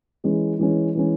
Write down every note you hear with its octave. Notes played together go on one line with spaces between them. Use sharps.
E3 G#3 C#4
E3 G#3 C#4
E3 G#3 C#4